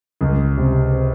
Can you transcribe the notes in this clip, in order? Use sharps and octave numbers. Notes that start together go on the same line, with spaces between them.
C#2
C3
C4